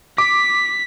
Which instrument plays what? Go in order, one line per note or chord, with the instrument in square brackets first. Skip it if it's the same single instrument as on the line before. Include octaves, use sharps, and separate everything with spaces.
[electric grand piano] D6 [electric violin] B6